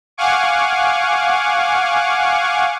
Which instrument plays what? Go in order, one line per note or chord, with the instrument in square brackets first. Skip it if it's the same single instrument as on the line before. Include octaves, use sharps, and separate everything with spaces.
[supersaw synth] F5 F#5 G#5 C#6 D6